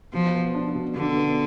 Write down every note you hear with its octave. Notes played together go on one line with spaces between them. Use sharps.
B2 F3
B3
D4
B2
B2 D3
B3